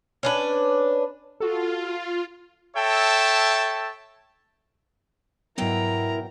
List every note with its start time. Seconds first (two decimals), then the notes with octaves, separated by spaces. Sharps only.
0.23 C#4 D4 B4
1.40 F4 F#4 A4
2.76 A4 C#5 E5 G5 A5
5.58 G#2 B2 F#3 B3 E4 A#4 G5 A#5